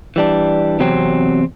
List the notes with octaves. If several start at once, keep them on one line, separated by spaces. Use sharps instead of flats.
E3 G3 D4
E2 C3 F#3 C4